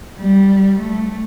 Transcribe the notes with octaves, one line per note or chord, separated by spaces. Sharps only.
G3
A3